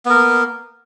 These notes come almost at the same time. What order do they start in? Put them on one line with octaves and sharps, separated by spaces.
B3 A#4 A#3